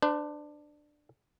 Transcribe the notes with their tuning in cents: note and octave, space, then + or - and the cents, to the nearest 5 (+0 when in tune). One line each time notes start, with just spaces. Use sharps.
D4 +15 C5 -40